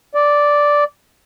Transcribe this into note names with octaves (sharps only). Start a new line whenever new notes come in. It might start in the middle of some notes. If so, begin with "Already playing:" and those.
D5